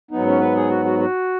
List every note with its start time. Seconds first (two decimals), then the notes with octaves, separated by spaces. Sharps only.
0.11 G#2 F#3 B3 D#4
0.26 C#4
0.40 B4
0.56 G#4
0.69 F#4
0.85 F#4
0.99 F#4